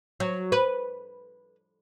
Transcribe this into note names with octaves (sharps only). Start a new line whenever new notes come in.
F#3
B4